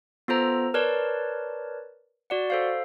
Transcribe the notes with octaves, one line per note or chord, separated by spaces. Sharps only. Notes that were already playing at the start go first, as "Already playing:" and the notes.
B3 F4 A4 C5 A#5
A#4 B4 C#5 D5 A5
F#4 D5 F#5
A4 C5 F5